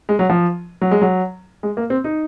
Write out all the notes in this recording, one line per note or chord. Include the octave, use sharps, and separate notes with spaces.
G#3
F#3
F3
F#3
G#3
F#3
G#3
A#3
C4
D#4